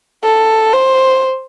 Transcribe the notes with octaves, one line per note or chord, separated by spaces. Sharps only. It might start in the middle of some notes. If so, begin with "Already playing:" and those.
A4
C5